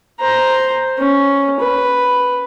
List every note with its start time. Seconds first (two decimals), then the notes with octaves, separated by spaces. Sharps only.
0.20 C5 A#5
0.98 C#4
1.60 B4